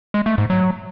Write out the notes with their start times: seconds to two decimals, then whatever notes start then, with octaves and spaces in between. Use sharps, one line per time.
0.14 G#3
0.26 A3
0.38 G#2
0.50 F#3